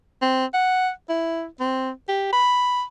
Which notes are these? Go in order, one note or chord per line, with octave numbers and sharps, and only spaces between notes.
C4
F#5
E4
C4
G4
B5